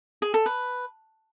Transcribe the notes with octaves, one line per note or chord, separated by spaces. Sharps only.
G#4
A4
B4